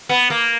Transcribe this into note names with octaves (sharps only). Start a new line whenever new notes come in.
B3
A#3